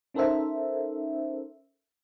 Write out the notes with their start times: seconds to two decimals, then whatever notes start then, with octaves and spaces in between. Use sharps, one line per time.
0.14 C#4 D#4 A4 A#4 C5 E5